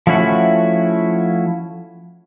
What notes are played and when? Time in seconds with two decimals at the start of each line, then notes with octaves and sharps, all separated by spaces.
0.07 F3 A3 C#4 E4 F#4